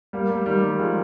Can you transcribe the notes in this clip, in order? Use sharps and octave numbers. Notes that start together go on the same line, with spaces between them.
G3 A#3
G3 A#3
D#3 G3
D#3 G3
F3 G#3